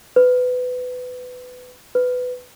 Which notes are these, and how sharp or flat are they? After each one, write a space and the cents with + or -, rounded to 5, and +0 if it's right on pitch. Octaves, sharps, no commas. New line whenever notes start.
B4 +20
B4 +15